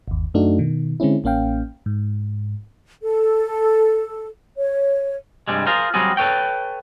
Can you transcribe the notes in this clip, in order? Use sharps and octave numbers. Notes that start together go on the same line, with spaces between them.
G1 D#2
F#2 A3 D4 D#4 F#4
B2 D#3
D3 G#3 C4 C#4 E4
A1 A#3 C#4 F5 G5
G#2
A4
C#5
G2 C3 G3 G#3
F4 G#4 A#4 C5
F#3 G3 C4 F4 F#4 G#4
A4 B4 C#5 G5